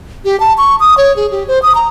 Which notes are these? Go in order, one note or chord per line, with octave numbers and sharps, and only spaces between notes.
G4
A5
C#6
D#6
C#5
G#4
G4
C5
D#6
A#5